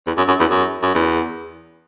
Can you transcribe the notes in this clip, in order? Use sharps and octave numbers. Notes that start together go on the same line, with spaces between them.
E2
F#2
F#2
E2
F#2
F#2
E2